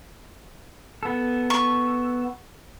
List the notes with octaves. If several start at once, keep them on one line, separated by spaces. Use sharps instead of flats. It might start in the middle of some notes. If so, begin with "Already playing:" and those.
B3 A4
C#6